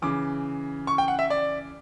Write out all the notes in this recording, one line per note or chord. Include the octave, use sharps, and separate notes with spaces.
C#3 E3 D6
C#6
G5
F#5
E5
D5